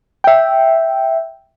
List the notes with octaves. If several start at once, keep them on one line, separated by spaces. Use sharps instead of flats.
E5 G5